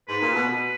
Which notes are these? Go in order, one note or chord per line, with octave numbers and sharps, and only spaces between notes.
G#2 B4
A#2
B2
B2 B4